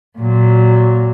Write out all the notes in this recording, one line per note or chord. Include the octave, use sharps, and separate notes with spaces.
A#2 F#3